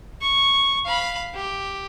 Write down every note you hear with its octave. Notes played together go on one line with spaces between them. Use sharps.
C#6
F5 B5
G4